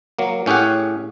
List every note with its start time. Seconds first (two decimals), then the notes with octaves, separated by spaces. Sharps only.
0.19 F#3 A#3
0.46 A2 C#4 G4 G#4 F#5